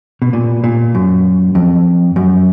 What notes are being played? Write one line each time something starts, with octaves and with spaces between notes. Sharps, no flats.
B2
A#2
A#2
F#2
F2
F#2